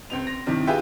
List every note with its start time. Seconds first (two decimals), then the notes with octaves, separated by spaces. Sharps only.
0.10 C#2 C4 F7
0.27 A#6
0.46 G2 C3 D#3 E4
0.67 F4 G4 G#4 B4 E5 G5